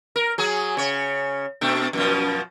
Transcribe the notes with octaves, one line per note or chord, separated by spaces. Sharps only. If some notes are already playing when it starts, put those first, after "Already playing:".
A#4
F#3 G#4
C#3 C#5
B2 A3 D4
F#2 B2 F3